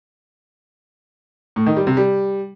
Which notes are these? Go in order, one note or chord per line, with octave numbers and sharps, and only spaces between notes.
A2
D#3
G3
C3
G3